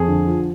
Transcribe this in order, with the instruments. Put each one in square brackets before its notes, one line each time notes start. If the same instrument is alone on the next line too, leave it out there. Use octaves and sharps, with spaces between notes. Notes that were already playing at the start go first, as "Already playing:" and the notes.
Already playing: [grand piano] F2 G#4
D3
F3